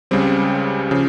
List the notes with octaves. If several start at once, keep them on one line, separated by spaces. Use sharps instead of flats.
C#2 C#3 G3 C4
C#3 F3